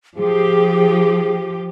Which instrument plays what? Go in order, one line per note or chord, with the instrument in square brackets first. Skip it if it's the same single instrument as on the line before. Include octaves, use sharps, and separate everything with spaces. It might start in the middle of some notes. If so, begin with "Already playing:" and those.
[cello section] F3 G4 [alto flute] G#4